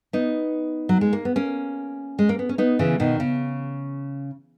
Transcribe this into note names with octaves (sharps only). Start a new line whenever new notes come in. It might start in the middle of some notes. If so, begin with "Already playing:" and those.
B3 D#4
F#3
G#3
A#3
B3
A#3 C#4
G#3
A#3
B3
C#4
B3 D#4
C#3 E3
B2 D#3
C#3